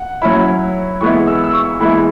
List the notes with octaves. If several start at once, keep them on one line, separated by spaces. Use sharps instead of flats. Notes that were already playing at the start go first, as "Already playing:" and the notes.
Already playing: F#5
F#3 C#4 E4 B5
E3 G#3 B3 E4 C#6
E6
E6
C#6
E3 G#3 B3 E4 B5